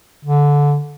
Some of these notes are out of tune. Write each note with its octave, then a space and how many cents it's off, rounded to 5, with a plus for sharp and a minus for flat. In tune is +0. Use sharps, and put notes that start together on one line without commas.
D3 -20